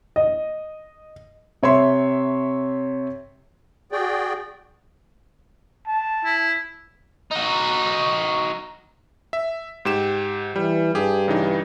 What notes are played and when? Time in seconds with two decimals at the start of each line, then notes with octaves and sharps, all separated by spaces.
0.16 D#5
1.63 C3 C#5 E5 C6
3.92 F#4 G#4 D5 G5
5.87 A5
6.25 E4
7.31 D#4 F#4
9.33 E5
9.85 G#2 G4 E7
10.56 E3 G3
10.95 G2 G4 G#4
11.28 C#3 E3 D#4